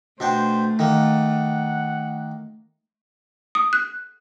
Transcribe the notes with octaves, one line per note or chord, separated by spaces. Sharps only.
B2 A3 D4 C5 G5
D#3 A#3 F#5
D#6
F#6